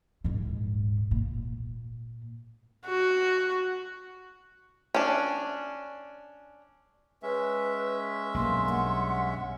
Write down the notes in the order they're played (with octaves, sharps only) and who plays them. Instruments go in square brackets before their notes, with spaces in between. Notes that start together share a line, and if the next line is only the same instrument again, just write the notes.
[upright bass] D#1 G#2
A#2
[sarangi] F#4
[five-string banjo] C#4 D4
[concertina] G#3 C#4 E5 [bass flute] B4
[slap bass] B1 G2 [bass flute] A#3 [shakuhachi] C6
[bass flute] F#5